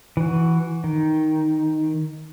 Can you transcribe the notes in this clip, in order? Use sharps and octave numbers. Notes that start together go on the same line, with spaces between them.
E3 F#4
D#3